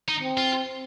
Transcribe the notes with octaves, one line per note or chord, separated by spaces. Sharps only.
D#4
C4
F4